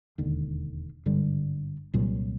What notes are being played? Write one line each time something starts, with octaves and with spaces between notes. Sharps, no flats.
E1 D#2 D3
G#1 G2 D3 G3
C2 A#2 F#3